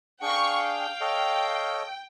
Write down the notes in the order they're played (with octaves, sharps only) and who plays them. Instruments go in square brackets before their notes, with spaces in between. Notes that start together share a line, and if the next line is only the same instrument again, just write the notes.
[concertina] D4 G#4 [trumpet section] F5 [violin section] G5 C#6
[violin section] G5
[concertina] A4 C#5 D#5